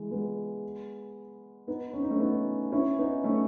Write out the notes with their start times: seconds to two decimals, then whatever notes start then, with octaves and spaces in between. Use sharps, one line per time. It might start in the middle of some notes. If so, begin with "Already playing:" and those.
Already playing: E3 G#3
0.11 G#3 B3
1.67 B3 D#4
1.93 C#4
2.02 D#4
2.10 A3 C#4
2.20 B3 D#4
2.72 C#4 E4
2.99 B3 D#4
3.24 A3 C#4